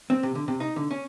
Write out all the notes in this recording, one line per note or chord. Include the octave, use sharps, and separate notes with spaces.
C4
C3
D3
C3
D#4
D3
C#4